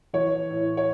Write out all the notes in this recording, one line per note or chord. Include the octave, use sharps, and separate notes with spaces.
E3 C#5
A2
C#5